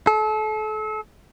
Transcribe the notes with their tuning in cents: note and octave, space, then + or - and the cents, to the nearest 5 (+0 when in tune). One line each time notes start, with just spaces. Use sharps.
A4 -35